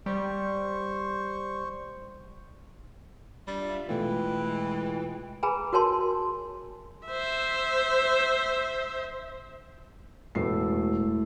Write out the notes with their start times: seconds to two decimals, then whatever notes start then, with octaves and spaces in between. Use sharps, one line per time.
0.06 G3 C5 C#6
3.48 G3 D4 F4 E5
3.89 B2 E3 G#3 A3 F4 G5
5.43 G#4 B4 G#5 A#5 B5
5.73 F#4 A#4 C#5 A5 C6
7.07 C5 E5
10.35 E1 A2 B4 C7